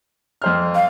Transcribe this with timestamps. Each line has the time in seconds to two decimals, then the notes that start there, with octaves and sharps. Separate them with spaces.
0.42 F2 C5 F6
0.75 F5